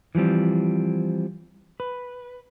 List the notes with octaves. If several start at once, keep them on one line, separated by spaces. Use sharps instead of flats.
E3 F3 G3 C4
B4